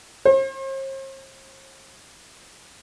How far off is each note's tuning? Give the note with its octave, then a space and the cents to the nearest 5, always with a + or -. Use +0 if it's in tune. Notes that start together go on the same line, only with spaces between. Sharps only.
C5 +45